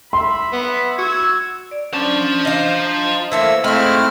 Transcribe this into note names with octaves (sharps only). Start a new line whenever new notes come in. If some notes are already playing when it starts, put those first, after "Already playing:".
E5 B5 C6
B3
F#4 E6 G#6
D5
C#4 D4 C5 D5 A5
D4 D#4 F4
E3 A3 A#3 C5 E6
G#3 A3 C4 E4 F4 B5 F6